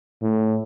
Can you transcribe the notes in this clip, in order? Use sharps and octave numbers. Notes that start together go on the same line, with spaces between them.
A2